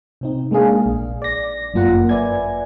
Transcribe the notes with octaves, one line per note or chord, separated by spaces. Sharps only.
C3 C4 D#4
G#3 A#3 D4 G#4 F5
A#1
D5 A#6
G1 F#2 A#3 F4 A#4 F#5
B4 D5 E5 G#5 G#6